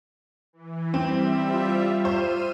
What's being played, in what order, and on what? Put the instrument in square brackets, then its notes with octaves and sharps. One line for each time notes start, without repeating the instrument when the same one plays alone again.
[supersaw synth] E3
[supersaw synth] G3 E5 [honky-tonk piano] C4 [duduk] C5
[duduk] F4
[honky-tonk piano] C5 [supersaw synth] E6 F6 D#7